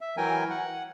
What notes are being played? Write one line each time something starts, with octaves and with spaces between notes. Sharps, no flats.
E5
E3 F#3 A#4 G5 G#5
F#5